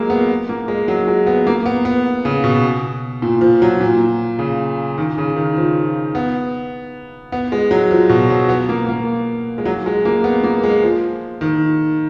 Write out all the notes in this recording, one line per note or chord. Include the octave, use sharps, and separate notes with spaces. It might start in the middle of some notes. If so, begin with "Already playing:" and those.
Already playing: F#3 G#3 A#3
B3
A#3
G#3
F#3
G#3
B3
A#3
B3
B3
C#3
B2
A#2
F3
F#3
A#2
C#3
D#3
C#3
D#3
F3
B3
B3
G#3
F#3
F3
B2
F#3
B3
A#3
A#3
G#3
F#3
G#3
A#3
B3
A#3
G#3
F3
D#3